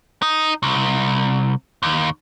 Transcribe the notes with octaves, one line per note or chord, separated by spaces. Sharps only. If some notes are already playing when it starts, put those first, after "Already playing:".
D#4
C2
D#2